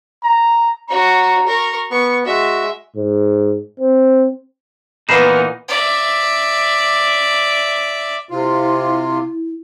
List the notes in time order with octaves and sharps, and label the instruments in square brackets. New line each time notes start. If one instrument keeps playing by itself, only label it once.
[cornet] A#5
[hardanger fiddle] F#4 C#5 [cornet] A#5
[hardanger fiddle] A#4 C#6
[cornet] B3 [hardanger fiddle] C#6
[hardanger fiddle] G#3 E5 [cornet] F#4
[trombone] G#2
C4
[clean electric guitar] A#2 E3 D#4 [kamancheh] B3 A#4 [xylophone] B5 C7 E7
[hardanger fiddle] D5 E5
[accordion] C3 F4 [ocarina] E4